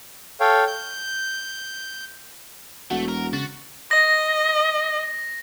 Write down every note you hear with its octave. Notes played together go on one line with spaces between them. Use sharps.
A4 C#5 F5 G5
G6
E1 A3 F#4
A#4
C#3 F#4 A6
D#5 A#6